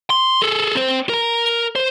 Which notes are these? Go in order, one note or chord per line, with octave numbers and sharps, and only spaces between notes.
C6
G#4 A4
C4 C5
A#4 A#5
C5